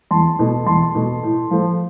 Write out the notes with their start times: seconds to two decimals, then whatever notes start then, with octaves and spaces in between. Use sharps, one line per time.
0.11 E2 A5 C6
0.39 B2 A3
0.66 E2 A5 C6
0.95 B2 A3
1.23 A2
1.51 F3 A3